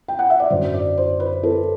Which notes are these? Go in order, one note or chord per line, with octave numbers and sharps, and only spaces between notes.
G5
F#5
E5
D5
F#2 D3 F#3 C5
D5
C5
B4
A4